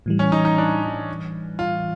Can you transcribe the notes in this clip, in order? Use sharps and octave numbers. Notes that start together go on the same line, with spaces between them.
A2 E3 G3
C#4
D#4
D#4
D4
D#4
F4